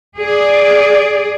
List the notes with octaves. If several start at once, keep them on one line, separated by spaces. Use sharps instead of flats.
G#4 D5